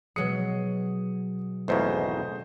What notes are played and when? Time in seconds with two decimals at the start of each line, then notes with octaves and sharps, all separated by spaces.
0.16 B2 F#3 G#3 D#6 C7 C#7
1.68 G#1 E2 C#3 A3 C5 D#5